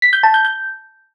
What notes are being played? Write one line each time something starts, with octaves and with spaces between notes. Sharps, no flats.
B6
G6
A5
G6
G6